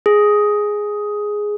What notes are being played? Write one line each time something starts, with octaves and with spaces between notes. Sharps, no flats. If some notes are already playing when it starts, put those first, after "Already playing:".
G#4